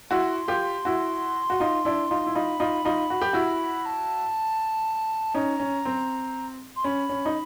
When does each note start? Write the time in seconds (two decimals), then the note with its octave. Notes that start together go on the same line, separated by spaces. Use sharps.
0.11 E4 F#4 C6
0.48 F4 G4
0.85 E4 F#4
1.50 F#4
1.60 D#4 F4
1.85 D4 E4
2.11 D#4 F4
2.26 E4
2.35 D#4 F4 B5
2.60 D#4 F4
2.85 D#4 F4
3.10 F#4
3.22 G4
3.33 E4 F#4
3.86 A5
5.34 C#4 D#4 A#5
5.60 C#4
5.85 C4
6.76 C6
6.84 C#4 B5
7.09 C#4
7.26 D#4